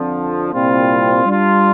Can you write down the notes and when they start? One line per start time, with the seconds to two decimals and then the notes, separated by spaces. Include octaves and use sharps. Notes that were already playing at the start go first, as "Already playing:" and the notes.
Already playing: F2 D3 F3
0.52 C2 A#2 G3 C4 F4
1.26 G3 D4 F4